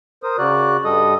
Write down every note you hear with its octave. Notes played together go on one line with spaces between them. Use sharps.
A#4 C5 D#6
C#3 F#4 D5 F#6
G2 G3 A4 D#5 D#6